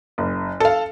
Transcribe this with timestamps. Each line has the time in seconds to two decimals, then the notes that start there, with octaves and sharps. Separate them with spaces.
0.18 F#1
0.60 A4 F5